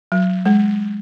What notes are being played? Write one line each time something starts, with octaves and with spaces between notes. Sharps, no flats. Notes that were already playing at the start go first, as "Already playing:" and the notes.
F#3
G#3